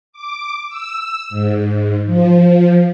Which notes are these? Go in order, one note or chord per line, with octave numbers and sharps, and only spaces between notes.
D6
E6
G#2
F3